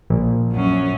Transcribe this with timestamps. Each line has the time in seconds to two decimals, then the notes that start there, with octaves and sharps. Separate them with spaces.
0.10 A#1
0.52 F#2 C#4